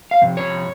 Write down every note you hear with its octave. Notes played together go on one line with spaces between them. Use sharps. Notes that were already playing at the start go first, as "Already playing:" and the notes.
F5
F2 C3
C#5